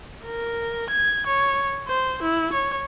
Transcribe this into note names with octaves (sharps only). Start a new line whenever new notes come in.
A#4
G#6
C#5
C5
E4
C#5